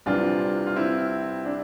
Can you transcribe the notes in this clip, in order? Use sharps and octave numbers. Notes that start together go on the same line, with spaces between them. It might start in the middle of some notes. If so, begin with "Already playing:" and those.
C2 C3 E3 D4 F4
F4
C4 E4
D4